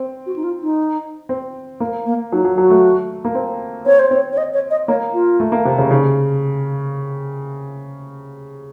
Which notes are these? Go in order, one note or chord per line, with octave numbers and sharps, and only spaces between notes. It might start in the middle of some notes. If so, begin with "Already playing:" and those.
Already playing: C4
F#4
D#4
F4
D#4
C4
A#3
A#3
F#3 D#4
F#3
F#3 F#4
A3
A#3
C4
C4 C#5
C5
C4 C#5
C#5
D#5
C#5
D#5
A#3 C#5
F4
A3
A#3
C3
C#3
C#3 D#4